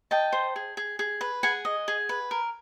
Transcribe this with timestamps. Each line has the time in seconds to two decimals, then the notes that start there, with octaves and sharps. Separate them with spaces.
0.11 D#5 G5 A5
0.33 C5
0.56 G#4
0.77 G#4
0.99 G#4
1.21 B4
1.43 G#4 F#5 G#5
1.65 D#5
1.88 G#4
2.09 B4
2.31 A#4